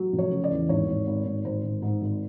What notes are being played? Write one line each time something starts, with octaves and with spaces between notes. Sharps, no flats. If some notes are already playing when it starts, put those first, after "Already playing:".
Already playing: F#3
F1
C#5
C#3
D5
E2
G#1 C#5
G#1
G#1
G#1
G#1 C5
G#1
G#2
G#1